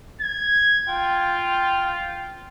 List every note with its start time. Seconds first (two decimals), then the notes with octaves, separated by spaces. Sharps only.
0.21 G#6
0.88 F4 G5